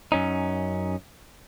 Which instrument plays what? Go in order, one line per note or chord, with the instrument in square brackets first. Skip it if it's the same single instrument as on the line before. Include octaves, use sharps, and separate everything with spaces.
[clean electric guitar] F#2 C#4 D#4